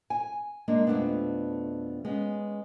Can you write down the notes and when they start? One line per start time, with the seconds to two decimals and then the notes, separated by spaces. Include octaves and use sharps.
0.10 G#5
0.68 G#3 A#3 D4
0.87 F2 B2 G#3 A3 B3 D4
2.05 G#3 B3 C#4